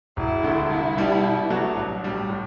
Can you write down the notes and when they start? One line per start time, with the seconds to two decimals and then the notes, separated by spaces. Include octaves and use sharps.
0.17 E1 E4
0.43 D2 D3 A3
0.70 C2 E4
0.96 B2 G3 D4 G4
1.23 B2
1.50 F#3 A3 D4 F#4
1.77 A1
2.03 A2 G3 D4
2.29 A2